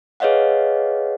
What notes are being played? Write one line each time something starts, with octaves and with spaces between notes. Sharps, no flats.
G#4 B4 C#5 D#5 F5 F#5